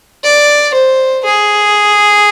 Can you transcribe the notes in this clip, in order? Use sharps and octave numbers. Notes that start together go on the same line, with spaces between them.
D5
C5
G#4